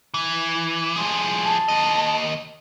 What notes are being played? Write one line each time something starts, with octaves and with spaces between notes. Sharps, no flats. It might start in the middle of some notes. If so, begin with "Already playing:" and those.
E3
F3 G#4
A5
D#2 D#5